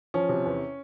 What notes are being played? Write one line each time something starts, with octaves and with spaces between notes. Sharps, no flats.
F3 C#4
C3
E2